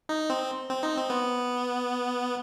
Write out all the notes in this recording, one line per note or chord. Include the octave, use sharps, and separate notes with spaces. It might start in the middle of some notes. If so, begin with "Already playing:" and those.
D#4
C4
C4
D#4
C4
B3